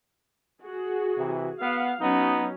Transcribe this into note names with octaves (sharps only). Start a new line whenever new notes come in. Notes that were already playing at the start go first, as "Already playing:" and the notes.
F#4 G#4
C3 E3
B3 F5
F#3 B3 C#4 D#4